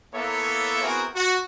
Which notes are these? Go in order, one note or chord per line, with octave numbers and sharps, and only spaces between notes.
A#3 B3 E4 A4 C#5 E5
B3 C4 E4 F#4 G#4 A#4
F#4